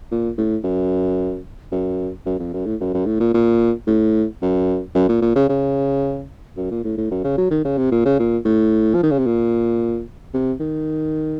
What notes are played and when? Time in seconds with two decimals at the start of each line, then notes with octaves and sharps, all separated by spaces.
0.11 A#2
0.38 A2
0.64 F#2
1.72 F#2
2.26 F#2
2.40 F2
2.54 F#2
2.66 A2
2.81 F#2
2.94 F#2
3.06 A2
3.20 A#2
3.34 A#2
3.87 A2
4.42 F#2
4.95 F#2
5.09 A#2
5.22 A#2
5.36 C#3
5.49 C#3
6.57 F#2
6.71 A#2
6.84 A2
6.98 A2
7.11 F#2
7.24 C#3
7.38 F#3
7.51 D#3
7.65 C#3
7.78 C3
7.92 A#2
8.05 C#3
8.19 A#2
8.45 A2
8.95 F3
9.03 D#3
9.11 C#3
9.18 C3
9.26 A#2
10.34 C3
10.60 D#3